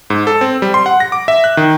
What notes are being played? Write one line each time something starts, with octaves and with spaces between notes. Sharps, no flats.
G#2
A4
C4
G3
C6
F#5
A#6
D6
E5
F#6
D#3